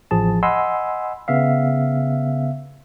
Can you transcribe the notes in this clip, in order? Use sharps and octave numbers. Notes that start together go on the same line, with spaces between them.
A1 F3 G#4 A5
D#5 F#5 G#5 B5 C6 E6
C#3 B3 E5 F5